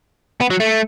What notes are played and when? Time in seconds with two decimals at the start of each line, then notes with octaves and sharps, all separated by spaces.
0.41 B3
0.50 F#3
0.60 A3